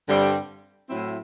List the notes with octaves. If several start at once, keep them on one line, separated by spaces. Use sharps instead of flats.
G2 D3 G3 C4
A2 F#3 C4 E4